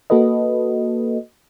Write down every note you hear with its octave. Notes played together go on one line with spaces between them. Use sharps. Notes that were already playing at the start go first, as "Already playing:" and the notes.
A#3 F#4 A4 B4 D#5